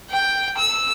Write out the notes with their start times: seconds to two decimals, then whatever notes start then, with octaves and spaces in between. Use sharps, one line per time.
0.10 G5
0.57 E6